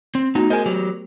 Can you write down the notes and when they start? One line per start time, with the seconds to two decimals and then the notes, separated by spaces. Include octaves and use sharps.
0.15 C4
0.35 A3 B3 D#4 F#4
0.50 G#4 A#4 C5 D#5 G#5
0.66 F#3 G4